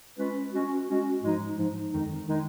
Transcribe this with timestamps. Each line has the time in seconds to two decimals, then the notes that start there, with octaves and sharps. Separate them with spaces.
0.18 G#3 C#4 F4 B4
0.52 G#3 C#4 F#4
0.88 G#3 C#4 F#4
1.23 G#2 F3 G#3 D#4
1.56 G#2 F3 G#3 D#4
1.91 F2 D#3 G#3 D#4
2.27 D#3 G#3 D#4